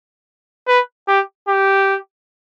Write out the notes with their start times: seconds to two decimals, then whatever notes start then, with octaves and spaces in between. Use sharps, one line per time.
0.68 B4
1.08 G4
1.48 G4